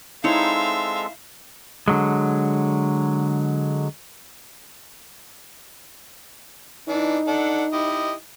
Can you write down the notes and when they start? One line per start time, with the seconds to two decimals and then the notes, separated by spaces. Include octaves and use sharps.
0.24 G#3 C4 D#4 E4 A4 C#5 E5 F5
1.88 D3 F#3 G#3
6.89 E3 D4 D#4
7.27 D4 A4 F#5
7.73 E4 G4 D#5